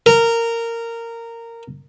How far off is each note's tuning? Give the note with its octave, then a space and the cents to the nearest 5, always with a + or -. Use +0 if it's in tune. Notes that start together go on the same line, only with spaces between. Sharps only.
A#4 -15